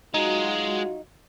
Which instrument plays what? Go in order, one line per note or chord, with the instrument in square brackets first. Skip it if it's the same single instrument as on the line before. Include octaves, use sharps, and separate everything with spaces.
[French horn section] F#3 F4 F#4 [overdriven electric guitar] G#3 [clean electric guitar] D#4